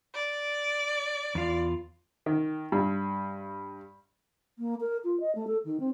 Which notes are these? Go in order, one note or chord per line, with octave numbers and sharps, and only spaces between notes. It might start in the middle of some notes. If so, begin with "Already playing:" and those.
D5
E2 F4
D#3
G2
A#3
A#4
F4
D#5
A3
A4
D#3
C4